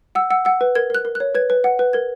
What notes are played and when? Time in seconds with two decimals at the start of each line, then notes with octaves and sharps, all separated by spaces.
0.15 F#5 E6
0.30 F#5 E6
0.45 F#5 E6
0.61 B4
0.75 A#4 G#6
0.90 A#4 F#6
1.05 A#4
1.15 F#6
1.20 C#5
1.35 B4 G#6
1.50 B4
1.64 F#5
1.79 B4
1.93 A#4 G#6